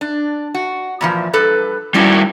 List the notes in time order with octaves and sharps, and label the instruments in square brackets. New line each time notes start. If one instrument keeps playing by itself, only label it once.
[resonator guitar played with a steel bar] D4
F#4
A#2 E3 F3
G2 A4 B4
[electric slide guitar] G3 E4 F#4 [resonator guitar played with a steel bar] C#4 D5